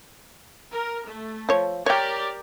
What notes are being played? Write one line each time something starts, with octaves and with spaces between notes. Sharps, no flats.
A#4
A3
F3 C#5
G4 A#4 C#5 D5 G5